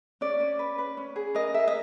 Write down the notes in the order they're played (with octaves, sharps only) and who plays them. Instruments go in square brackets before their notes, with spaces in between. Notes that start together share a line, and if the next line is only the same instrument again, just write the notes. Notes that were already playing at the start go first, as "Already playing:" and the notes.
[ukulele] C#4 D5
C#4
B4
B4
C#4
G#4
A#4 D#5
A#4 E5
D#5